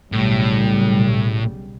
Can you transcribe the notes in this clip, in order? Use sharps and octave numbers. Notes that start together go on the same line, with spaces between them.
B1 A2 C#3 G3